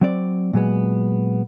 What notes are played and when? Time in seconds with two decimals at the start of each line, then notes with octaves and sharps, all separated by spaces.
0.01 F#3 C4 D5
0.53 A#2 F#3 G#3 B3